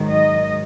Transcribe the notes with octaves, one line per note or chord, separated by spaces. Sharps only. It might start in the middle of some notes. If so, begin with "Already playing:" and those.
Already playing: G#2 D#3 F#3
D#5